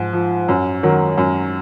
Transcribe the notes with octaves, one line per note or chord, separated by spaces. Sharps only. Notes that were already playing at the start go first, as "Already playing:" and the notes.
Already playing: G#2 F3
F3
F#2
D#3 F#3
F#2